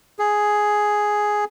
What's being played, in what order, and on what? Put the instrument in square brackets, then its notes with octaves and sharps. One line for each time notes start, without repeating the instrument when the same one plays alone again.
[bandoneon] G#4